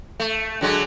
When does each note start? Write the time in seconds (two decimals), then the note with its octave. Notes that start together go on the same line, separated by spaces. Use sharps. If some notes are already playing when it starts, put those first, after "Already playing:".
0.20 A3
0.61 D3 F#3 G#3